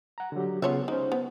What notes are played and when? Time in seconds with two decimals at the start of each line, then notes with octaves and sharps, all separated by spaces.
0.18 F#5 A#5
0.32 D3 F#3 G4
0.62 C#3 B3 F4 C#5 E5 F#5
0.88 G#3 C#4 D#4 C5
1.12 B3